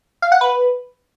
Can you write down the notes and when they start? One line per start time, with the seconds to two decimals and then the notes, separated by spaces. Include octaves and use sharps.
0.22 F5
0.32 F#5
0.41 B4